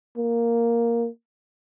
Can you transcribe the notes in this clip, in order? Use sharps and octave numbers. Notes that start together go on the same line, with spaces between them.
A#3